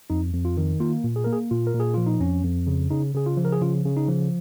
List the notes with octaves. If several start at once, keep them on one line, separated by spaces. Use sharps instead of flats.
F2 D#4
F2
F4
D#3
A#3 F4
A#2
G#4
A#3 A#4
G#4
A#2 F4
A#4
A#2
G#4
F3 F4
D#4
F2 C#4
F2
C#3
C#3 D#4
C#3 G#4
F4
F3
A#4
G#4
C#3 F4
C#3
D#4
F3